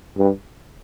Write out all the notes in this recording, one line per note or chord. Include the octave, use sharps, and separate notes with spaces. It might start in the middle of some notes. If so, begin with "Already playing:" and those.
G2